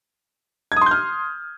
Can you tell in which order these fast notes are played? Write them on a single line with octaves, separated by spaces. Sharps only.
G#6 D#6 C6 G6 F6